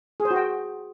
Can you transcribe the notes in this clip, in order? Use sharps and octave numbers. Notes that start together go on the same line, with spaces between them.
G#4
C5
F#4
G5